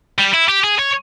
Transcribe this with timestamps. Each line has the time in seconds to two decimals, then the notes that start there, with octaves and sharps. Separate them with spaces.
0.19 G3
0.34 E4
0.49 G4
0.64 G#4
0.79 C#5